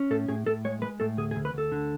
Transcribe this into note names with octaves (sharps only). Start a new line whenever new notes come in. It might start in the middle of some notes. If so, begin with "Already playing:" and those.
Already playing: C#4
A2 A4
A2 G#4
A2 A4
G#3 C#5
G#3 B4
A2 A4
D2 G#4
G#4
D2
B4
D2 A4
D3